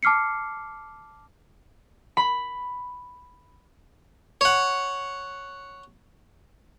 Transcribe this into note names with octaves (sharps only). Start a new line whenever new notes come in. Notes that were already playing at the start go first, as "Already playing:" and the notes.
A5 D6 F6 C7 C#7
B5
C#5 F#5